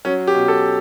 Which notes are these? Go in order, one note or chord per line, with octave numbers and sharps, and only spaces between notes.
F#3 C#4
G4
B2
A4